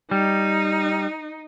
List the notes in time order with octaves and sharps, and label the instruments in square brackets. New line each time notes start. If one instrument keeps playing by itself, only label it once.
[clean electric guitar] G3 [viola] D#4